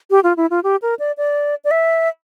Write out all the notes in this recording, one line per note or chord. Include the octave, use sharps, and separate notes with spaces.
G4
F4
E4
F4
G4
A#4
D5
D5
D5
E5